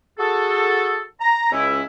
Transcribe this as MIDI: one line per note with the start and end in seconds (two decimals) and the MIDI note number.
0.19 1.03 66
0.19 1.03 68
0.19 1.03 69
1.21 1.50 82
1.52 1.82 37
1.52 1.82 61
1.52 1.82 64